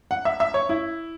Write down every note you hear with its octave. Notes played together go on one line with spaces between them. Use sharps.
F#5
E5
E5
C#5
E4